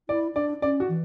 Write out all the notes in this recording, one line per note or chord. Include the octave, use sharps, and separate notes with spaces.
E4 D5
D4 D5
C#4 D5
F#4
E3